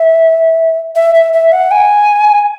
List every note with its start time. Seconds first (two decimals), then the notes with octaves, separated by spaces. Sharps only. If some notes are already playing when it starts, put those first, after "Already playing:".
Already playing: E5
0.95 E5
1.14 E5
1.33 E5
1.52 F#5
1.71 G#5